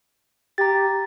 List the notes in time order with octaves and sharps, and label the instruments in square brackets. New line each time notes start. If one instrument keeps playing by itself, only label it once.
[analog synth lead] G4 [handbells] A#5 A6